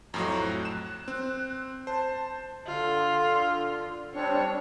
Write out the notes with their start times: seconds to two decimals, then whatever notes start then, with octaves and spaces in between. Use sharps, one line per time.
0.14 F2 A2 F#3 A#5
0.40 F#6
0.65 E7
1.08 C4
1.87 C5 A5
2.66 D3 F4
4.15 G3 C4 D4 C#5